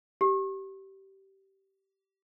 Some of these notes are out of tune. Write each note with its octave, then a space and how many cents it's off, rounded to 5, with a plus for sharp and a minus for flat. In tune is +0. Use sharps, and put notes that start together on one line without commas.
G4 -20